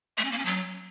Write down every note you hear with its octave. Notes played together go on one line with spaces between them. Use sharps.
A3
C#4
A#3
C#4
F#3